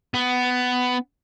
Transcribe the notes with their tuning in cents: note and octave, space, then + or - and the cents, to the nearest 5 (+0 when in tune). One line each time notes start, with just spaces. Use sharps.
B3 +15